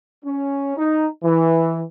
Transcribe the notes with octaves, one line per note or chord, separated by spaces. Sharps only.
C#4
D#4
E3